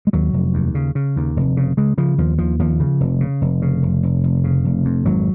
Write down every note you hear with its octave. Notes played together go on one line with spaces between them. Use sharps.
G#3
D#2 F#3
F1
D#2
C#3
C#3
D#2
F1
C#3
C#3 G#3
C#3 F3
D#2 F3
D#2 F3
D#2 F3
C#3
F1
C#3
F1
C#3
F1
F1
F1
C#3
F1
F2
G#1 F#3